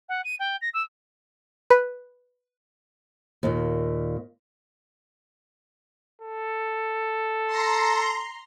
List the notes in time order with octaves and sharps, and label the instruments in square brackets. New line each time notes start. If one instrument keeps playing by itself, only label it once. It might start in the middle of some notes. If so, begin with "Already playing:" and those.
[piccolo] F#5
D#7
G5
A#6
E6
[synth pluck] B4
[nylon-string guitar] D#2 A#2
[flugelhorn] A4
[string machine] A#5 C6